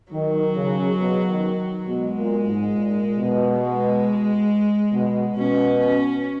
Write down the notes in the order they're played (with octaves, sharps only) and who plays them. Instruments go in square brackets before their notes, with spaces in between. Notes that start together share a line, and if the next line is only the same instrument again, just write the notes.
[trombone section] D#3 [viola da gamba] F#3
[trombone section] C#3
B2
D#3
[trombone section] B2 [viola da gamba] G#3
[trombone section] A#2
G#2
A#2
B2
[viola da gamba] G#3
[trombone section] B2
[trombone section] B2 [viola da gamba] C#4
[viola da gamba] C#4